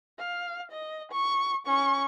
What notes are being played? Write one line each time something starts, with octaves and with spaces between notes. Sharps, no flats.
F5
D#5
C#6
C#4 C#6